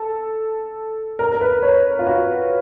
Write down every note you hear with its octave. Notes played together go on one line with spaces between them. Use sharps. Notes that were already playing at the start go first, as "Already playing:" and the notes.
Already playing: A4
A#4
A#4
B4
C#5
F4
F#4